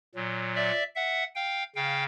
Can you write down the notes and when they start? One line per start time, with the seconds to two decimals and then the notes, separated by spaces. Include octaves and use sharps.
0.15 A#2 F#3
0.55 D5 E5
0.95 E5 F#5
1.35 F5 G5
1.76 C#3 F5 G5